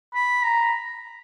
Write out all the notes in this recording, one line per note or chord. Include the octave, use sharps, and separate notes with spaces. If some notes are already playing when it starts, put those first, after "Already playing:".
B5
A#5